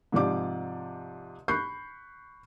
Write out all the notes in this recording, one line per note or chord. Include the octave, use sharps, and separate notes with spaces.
G#2 C3 F3 G4 D5 D6
B5 C#6 F#6 G6 C7